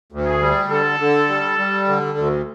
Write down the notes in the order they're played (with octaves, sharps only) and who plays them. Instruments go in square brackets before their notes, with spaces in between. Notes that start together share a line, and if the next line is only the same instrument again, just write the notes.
[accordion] D2
[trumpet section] G#4
[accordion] G3
[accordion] D3 [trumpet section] A4
[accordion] D3
G3
G3
D3
D2